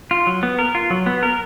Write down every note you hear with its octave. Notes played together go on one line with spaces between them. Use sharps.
F4
F#3
B3
A#4
F4
F#3
B3
A#4